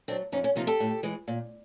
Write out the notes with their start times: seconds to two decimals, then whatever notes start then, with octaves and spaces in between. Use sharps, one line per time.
0.08 F#3 A3 C4 D4
0.32 F2 C#4 D#4
0.44 C#4
0.56 C3 F3 A#3 D#4 F4
0.67 G4 A4
0.80 A2
1.03 E3 G#3
1.28 A#2